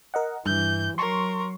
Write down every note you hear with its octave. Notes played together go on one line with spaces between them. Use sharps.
A#4 D#5 F#5
G2 E3 G6
F#3 A#4 C6 C#6